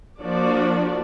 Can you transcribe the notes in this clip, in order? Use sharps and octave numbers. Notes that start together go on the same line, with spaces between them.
F3 A#3 D4 F#4 D5